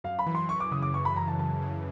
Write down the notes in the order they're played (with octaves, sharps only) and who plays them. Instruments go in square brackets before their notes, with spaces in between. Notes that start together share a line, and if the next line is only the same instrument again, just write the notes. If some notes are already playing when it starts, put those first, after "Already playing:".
[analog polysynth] F#2 [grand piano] F5
[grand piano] B5
[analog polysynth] E3
[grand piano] C6
[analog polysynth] E3 [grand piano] C#6
[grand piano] D6
[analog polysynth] C#3 [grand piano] D#6
[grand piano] D6
[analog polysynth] F#2 [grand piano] C#6
[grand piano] B5
[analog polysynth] F#2 [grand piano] A#5
[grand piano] A5
[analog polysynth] F#2 [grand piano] A5
[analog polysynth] C#3